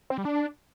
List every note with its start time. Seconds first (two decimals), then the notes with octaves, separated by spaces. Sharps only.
0.10 C4
0.18 G3
0.25 D4